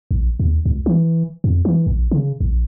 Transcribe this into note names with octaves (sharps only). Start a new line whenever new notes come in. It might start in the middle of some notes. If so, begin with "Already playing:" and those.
A#1
D#2
C#2
E3
F2
E3
A#1
C#3
A#1